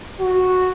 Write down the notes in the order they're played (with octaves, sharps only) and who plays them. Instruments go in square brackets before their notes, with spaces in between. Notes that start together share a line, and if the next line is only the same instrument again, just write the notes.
[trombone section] F#4